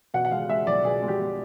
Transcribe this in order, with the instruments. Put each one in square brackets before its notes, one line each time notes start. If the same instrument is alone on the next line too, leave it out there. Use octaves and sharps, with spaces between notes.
[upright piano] B2 F#5
F#5
G#3 F5
G#3 E5
B1 D5
B2 G#4
G#3
G4
G#3